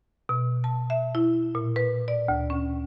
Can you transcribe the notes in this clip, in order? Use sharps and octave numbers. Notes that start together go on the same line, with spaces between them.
B2
A5
E5
E4
A#2
B4
D5
D2
C#4